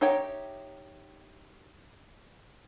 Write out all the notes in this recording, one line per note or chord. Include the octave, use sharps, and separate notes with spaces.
D#4 G4 C#5 E5 G5